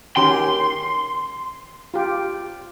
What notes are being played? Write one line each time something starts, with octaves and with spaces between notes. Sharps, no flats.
D#3 C#4 G4 C6
F4 G4